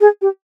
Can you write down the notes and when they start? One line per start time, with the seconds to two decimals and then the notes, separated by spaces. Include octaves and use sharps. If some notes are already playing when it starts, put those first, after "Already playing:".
0.01 G#4
0.22 G4